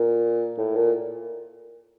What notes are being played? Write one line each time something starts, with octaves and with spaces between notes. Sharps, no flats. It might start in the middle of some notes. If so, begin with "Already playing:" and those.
Already playing: A#2
A2
A#2